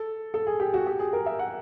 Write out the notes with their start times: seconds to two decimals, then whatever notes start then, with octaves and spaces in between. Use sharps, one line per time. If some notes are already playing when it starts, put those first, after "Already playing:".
Already playing: A4
0.34 A4
0.47 G#4
0.60 G4
0.74 F#4
0.86 G4
0.99 G#4
1.13 A#4
1.26 E5
1.39 F#5